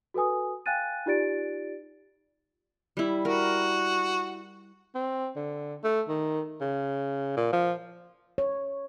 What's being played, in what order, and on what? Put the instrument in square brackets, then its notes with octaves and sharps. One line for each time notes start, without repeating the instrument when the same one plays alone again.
[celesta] F#4 A4 B4 G#5 D#6
F5 G5 G#5 F#6 A6 D#7
D#4 F4 G4 D5 A6 D7
[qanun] G3 E4
[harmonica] F#4 [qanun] A#4
[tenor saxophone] C4
D3
A3
D#3
C#3
A#2
F3
[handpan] C#5